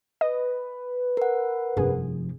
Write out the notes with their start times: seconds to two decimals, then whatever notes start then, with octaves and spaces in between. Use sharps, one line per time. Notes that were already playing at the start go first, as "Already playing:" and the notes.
0.21 B4 D#5
1.17 A#4 F#5
1.77 F1 G2 F3 G#4